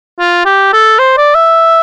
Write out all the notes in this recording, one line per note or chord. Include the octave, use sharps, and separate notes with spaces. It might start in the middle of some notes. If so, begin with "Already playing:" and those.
F4
G4
A4
C5
D5
E5